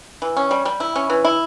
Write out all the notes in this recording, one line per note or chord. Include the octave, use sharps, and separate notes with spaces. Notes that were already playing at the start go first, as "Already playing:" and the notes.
E3
C#4
G3
G3
E4
C#4
E3
E4